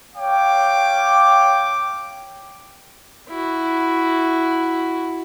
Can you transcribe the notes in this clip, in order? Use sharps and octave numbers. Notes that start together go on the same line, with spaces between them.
C#5 F5 G5 D6
E4 F#4